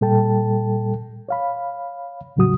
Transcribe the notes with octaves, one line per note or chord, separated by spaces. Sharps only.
A#2 G3 A4 G5 A5
C#5 F5 B5
E2 A2 C#3 F#3 F#4 D#6